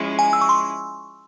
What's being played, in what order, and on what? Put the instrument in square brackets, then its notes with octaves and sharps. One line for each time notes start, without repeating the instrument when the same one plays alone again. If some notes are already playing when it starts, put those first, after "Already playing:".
Already playing: [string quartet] F3 G#3 C#4 E4
[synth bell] G#5
E6
C#6
C6